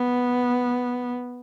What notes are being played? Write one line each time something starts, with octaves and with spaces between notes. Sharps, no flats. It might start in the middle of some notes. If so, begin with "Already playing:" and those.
Already playing: B3